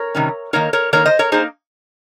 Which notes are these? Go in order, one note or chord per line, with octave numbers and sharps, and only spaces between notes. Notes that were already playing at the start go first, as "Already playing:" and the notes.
Already playing: A#4 C#5
C3 D#3 G3 C#4
D#3 A#3 D#4 A#4 C#5
A#4 C#5
D#3 A#3 D#4 A#4 C#5
C5 D#5
A#4 C#5
A#3 D#4 G#4 C5